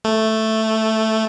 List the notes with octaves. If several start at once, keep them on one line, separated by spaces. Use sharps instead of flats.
A3